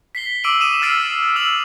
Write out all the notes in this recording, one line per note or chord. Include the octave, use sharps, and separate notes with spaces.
B6 C7 G7
D6 E6 D7 D#7 F#7
D#6 D#7 E7
E6 F6 A6 C7 D7
E6 F7 F#7